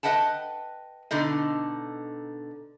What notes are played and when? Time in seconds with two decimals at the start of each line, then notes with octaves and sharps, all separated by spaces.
0.03 B4 D#5 F#5 G5 A5
1.11 B2 D3 D#4 D#5